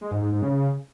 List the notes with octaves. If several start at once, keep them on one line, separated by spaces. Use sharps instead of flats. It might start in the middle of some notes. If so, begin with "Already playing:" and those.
G#3
G#2
G#2
G#2
C#3